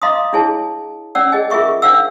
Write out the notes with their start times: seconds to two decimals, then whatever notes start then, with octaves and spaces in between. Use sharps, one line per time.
0.02 D#5 F5 A#5 C6 D6 D#6
0.33 D4 E4 G#4 C#5 A5
1.15 C#4 C#5 D5 F#5 E6
1.32 G#4 D#5 G#5
1.50 F4 G#4 A#4 E5 C#6 D6
1.82 D4 C5 F5 F#5 E6